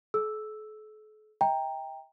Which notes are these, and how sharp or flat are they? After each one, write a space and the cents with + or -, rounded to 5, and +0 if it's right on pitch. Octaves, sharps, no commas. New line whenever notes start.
A4 -45 E6 +0
E5 -45 G5 +15 A#5 +0